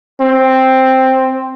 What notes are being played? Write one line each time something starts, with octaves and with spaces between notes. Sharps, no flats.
C4